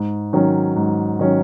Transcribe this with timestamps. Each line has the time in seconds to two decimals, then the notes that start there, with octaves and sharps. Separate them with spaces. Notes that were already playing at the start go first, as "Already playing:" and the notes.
Already playing: G#2
0.33 D#3 F#3 C#4
0.76 G#2
1.19 D#3 F#3 C#4